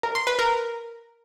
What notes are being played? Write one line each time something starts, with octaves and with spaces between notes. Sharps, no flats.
A#4
C6
B4
A#4